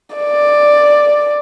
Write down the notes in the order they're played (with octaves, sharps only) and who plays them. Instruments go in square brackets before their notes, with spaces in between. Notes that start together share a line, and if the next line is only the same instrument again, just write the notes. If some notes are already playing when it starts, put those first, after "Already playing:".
[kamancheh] D5